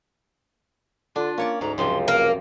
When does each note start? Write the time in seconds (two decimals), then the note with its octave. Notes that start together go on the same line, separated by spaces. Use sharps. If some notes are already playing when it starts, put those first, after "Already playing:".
1.16 D3 D4 F4
1.38 A#3 C#4 C#5 D5
1.61 D2 G#2 A#5
1.78 C#2 F#2 C3 F3 C6
2.08 A#3 F6